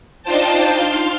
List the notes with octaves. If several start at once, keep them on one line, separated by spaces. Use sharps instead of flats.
D4 D#4 F4 C5 G5 A5
F5 C6